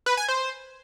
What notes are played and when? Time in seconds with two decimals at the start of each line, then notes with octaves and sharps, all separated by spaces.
0.06 B4
0.17 G#5
0.28 C5